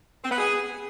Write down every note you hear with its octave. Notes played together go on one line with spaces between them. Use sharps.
C4
B3
G#4